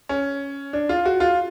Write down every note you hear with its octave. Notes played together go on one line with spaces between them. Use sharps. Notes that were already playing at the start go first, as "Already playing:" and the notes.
C#4
D4
F4
F#4
F4